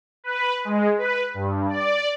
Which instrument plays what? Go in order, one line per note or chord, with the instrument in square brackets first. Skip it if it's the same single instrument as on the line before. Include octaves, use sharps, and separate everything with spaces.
[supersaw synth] B4
G#3
B4
G2
D5